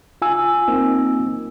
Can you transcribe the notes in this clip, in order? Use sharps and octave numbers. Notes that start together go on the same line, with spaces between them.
F4 G#5 E6
A#3 C4 D#4